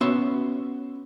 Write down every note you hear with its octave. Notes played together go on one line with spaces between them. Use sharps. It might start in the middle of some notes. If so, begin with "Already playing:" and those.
B3 C#4 F#4 E5 C6